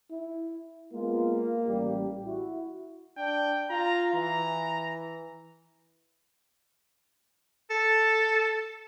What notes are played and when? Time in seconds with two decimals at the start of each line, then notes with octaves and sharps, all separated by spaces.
0.11 E4
0.92 G#3 A#3 B3 F4
1.67 A1 G3 G4
2.24 E4 F#4
3.17 D4 G5
3.70 F4 A#5
4.13 E3 A#5
7.70 A4